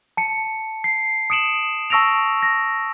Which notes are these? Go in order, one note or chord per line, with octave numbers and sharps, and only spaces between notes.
A5 C#7
C7
D#6 C#7 D7 E7 F#7
A5 C#6 E6 A#6 D7 F7
A#6